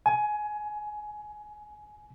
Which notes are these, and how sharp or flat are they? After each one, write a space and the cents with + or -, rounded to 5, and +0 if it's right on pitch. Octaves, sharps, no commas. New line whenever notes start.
G#5 +20